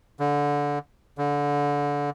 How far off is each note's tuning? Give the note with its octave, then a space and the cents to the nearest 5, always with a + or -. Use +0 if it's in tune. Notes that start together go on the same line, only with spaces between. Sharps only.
D3 -20
D3 -25